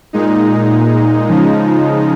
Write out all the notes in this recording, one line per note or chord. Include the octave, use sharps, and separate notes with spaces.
A#2 G#3 D#4
C#3 F3 G#3 D#4